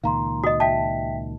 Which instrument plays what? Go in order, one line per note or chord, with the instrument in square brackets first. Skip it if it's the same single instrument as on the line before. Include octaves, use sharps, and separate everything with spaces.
[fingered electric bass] C#2 A#2 D#3 [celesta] F5 A#5 C6
[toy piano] F#4 D#5 [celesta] D#6
[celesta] E5 G5 B6 [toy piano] A5